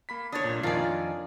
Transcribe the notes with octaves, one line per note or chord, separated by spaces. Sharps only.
A#3 B5 B6
D4 C#5 D#6 A6
B1 A#2
F2 D#3 D4 F4 D5 G#5 A#5 C7